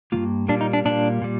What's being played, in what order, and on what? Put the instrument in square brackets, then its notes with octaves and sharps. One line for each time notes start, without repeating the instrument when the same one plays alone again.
[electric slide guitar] G2 D#3 A#3 F4
A#2 G3 A#3 D4
D#4
D4
A#2 G3 A#3 D4
A#2 G3